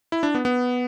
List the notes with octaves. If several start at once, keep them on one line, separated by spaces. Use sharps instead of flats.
E4
D4
B3
B3